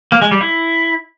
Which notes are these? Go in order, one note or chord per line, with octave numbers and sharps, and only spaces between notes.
A#3
G#3
G3
E4